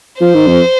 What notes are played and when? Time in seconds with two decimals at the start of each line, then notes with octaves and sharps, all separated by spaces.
0.21 F3 C5
0.34 D#3
0.47 F2